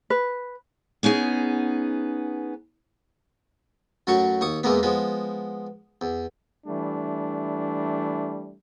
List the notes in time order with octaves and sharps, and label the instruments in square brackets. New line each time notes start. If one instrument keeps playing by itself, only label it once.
[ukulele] B4
[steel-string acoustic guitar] B3 C#4 D#4 G#4
[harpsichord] F#2 A2 F#3 F#4 C#6
D#2 C#6 D#6
E2 E3 G#3 A#3 B3
F3 G#3 B3
E2
[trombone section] E3 G3 A3 D4